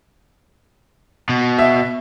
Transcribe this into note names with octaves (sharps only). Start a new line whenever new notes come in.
B2
E5